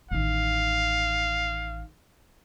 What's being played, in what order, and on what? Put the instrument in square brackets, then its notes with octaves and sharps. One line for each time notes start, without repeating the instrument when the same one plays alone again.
[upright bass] A1 D#3 [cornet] F5